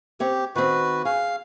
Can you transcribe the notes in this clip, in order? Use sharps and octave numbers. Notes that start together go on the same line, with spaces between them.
C4 G4 C#5
D#3 C4 F#4 B4
G#4 F5